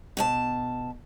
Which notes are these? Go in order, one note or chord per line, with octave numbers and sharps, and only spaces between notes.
B2 C#5 A5